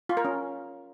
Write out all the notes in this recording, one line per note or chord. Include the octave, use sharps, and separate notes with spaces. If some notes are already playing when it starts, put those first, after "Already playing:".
F4
A#4
C#4